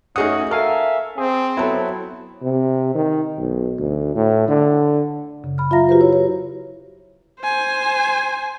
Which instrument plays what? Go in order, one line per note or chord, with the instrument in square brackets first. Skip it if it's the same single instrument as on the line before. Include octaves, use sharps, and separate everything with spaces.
[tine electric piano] A3 F#4 F#5 [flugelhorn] C#4 [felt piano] D#4 G#4 D#6
[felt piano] A4 [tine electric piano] A#4 F5 G#5 [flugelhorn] E5
[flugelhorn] C4 [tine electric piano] G#4
[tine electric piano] F#3 E4 [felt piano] B3 A4
[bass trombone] C3
D#3
B1
D2
A2
D3
[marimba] F#2 C#3
B5 F6
F#3 F4 E5 F5 A#5 A#6
F#4 G4 B4 C5
E4 C#5
C#5
[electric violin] C5 G#5